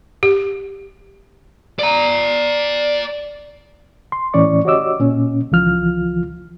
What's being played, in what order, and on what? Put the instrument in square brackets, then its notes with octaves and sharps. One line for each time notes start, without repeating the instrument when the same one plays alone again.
[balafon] G4
[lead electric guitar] D5 A#5
[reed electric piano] C6
A2 E3 C#4 D5 C#6
F#4 G4 C#5 D#5 D6 E6
A#2 C#4
C#2 E3 F3 F4 F6